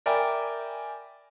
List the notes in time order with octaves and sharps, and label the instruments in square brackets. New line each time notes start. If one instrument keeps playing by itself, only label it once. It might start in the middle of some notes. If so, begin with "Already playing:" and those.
[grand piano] A#4 D5 E5 G5 G#5 B5